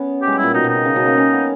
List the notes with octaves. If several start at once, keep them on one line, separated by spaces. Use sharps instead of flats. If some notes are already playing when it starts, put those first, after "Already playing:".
Already playing: B3 C#4
G4
G#3
G3
E4
A#2
B2 D#4
B2
D#4
C#3
C#3
B2
A#3
C#4
B3